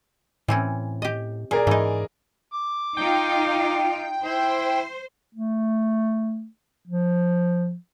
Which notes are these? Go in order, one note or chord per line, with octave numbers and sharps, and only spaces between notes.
A2 E3 C4 C#4
G4 D#5
A#2 G#4 A#4 D5
G#2 E3 D#4
D6
D#4 F4 G5
E4 C5
A3
F3